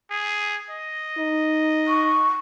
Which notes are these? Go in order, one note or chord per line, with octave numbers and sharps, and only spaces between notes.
G#4
D#5
D#4
C#6